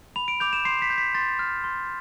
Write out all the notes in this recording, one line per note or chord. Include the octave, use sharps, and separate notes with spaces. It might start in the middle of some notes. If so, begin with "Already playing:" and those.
B5 F7
D7
D6 G6 F7
E7
C6 C7
B6
G6
B6
C6 A6
F6
C6